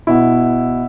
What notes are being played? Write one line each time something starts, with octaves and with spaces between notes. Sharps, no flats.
B2 E4